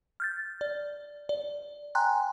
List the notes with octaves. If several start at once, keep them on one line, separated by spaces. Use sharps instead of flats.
F6 G6 A6
D5
D5
G5 G#5 A#5 C6 F#6